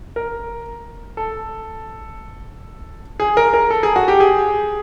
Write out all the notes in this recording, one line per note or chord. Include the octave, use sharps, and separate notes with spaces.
A#4
A4
G#4
A#4
A#4
A4
G#4
F#4
G4
G#4